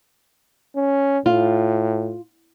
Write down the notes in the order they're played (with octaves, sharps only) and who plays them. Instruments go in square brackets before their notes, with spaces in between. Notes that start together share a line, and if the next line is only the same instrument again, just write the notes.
[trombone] C#4
[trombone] A2 [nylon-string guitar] F4